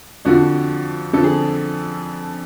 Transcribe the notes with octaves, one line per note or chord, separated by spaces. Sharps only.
F2 D3 F3 F#4
F2 D3 F3 A4
G#4